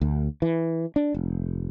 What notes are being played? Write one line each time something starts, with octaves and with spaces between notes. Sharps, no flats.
D2
E3
D4
F1